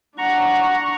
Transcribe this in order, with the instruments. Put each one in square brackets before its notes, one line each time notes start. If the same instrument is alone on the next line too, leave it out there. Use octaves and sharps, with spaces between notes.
[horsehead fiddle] D4 F#5 [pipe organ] A#5 C#6